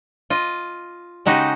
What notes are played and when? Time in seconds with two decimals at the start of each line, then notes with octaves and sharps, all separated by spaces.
0.30 F4 D#5
1.26 C#3 G#3 D#4 F#4 G4